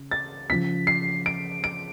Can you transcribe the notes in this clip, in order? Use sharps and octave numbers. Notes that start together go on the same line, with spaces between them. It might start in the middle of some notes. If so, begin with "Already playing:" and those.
Already playing: C#3
A6
C#3 F3 B6
C7
D7
D7